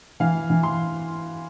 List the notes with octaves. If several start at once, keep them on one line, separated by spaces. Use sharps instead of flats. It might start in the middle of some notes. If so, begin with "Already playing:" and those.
E3 F5
E3
C6